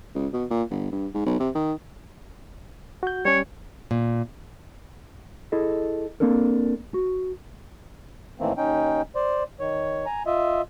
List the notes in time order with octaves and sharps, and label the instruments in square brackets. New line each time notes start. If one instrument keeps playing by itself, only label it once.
[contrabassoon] C#2
B2
A#2
G1
G2
G#2
B1
C3
D#3
[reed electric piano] F#4 G6
[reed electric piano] G3 C#4 [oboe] C#5
[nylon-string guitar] A#2
[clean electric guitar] E4 G#4 A4 D#5
A#3 C4 D4 A4 A#4
F#4
[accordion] A2 D#3 E3 A3 A#3 C4
D#2 C#4 D#4 G5
C5 D5
D#3 C#5
G#5 A#5
F4 D#5 E5